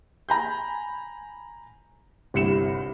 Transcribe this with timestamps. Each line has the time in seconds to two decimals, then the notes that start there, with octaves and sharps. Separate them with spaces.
0.29 G#5 A#5 B5 G6
2.34 G1 C2 C#7 E7